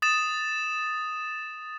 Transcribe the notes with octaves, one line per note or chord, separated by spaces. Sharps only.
D#6 A6 E7